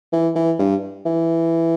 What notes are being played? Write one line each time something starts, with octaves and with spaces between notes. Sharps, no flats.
E3
E3
G2
E3